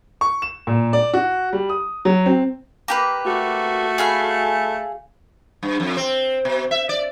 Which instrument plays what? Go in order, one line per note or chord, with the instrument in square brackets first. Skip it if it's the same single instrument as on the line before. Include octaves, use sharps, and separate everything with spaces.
[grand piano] C#6
E7
A#2
D5
F#4
G3
D#6
F#3
C4
[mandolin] A#3 G4 B4
[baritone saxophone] A3 [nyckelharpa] F#4
[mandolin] G#4 F5 B5
[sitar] G2
F2
C4
B2
E5
D5